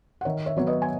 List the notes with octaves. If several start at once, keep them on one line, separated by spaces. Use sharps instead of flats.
F#5
D#3 C#5 E5
C#5 E5
F#3 B3 C#5
B4 D#5
G#5